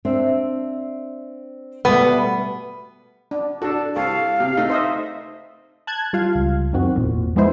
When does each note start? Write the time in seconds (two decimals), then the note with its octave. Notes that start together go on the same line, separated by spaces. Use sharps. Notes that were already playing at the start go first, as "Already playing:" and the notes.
0.05 C4 D4 E5
1.85 B2 G3 A3 B3
3.31 D4
3.62 D4 F#4 A4
3.96 C2 A4 F5
4.40 C3
4.57 A3 D#4
4.70 C5 D#5 E5
5.87 A5 F#6 G#6
6.13 G3 F4 F5
6.35 C#2
6.73 F#2 D#3 C4 F#4
6.95 G#1 E2 A#2
7.36 F3 G#3 B3 D#4 E4 C5